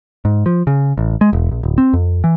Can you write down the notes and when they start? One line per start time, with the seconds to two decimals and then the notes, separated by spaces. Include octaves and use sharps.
0.25 G#2
0.46 F3
0.67 C#3
0.98 A1
1.21 G#3
1.33 E1
1.51 A#1
1.63 D1
1.78 C4
1.93 F2
2.24 E3